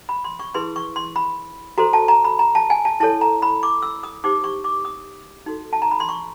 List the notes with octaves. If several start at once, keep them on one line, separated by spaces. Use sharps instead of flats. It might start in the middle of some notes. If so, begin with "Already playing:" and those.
B5
C6
C#6
E4 G#4 B4 C6
C#6
C6
B5
F#4 A4 C5 A#5
A5
A#5
B5
A#5
A5
G#5
A5
E4 A4 C#5 A5
A#5
B5
D6
E6
D#6
D#4 G4 C5 D6
C#6
D6
D#6
D#4 F#4 A4
A5
A#5
B5
C6
C#6